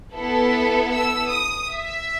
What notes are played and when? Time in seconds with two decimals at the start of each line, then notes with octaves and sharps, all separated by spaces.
0.14 B3 E4 A4
0.92 E6
1.30 D#6
1.69 E5